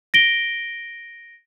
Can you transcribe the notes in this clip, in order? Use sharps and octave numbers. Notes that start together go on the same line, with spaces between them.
A#6 D7 G7